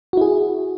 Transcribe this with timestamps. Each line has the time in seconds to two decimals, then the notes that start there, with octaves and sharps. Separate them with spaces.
0.13 F#4
0.17 E4
0.21 G#4